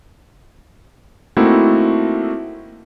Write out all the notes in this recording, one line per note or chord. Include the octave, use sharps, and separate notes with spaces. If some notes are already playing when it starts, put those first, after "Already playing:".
A3 A#3 C4 D#4 E4 F#4